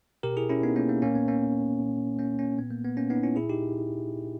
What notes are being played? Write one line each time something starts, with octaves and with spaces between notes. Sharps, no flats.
B2 G4 A#4
E4 G#4
C#4 E4
B3 D#4
A#3 C#4
A#3
A#2 A#3 C#4
B3
A#3 C#4
A#2
A#3 C#4
A#3 C#4
A#2 B3
A#3
B3
A#3 C#4
B3 D#4
C#4 E4
A#2 E4 G#4
D#4 G4